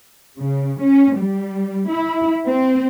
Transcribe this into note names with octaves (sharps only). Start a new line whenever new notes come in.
C#3
C#4
G3
E4
C4